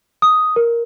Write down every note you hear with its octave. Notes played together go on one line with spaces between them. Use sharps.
D#6
A#4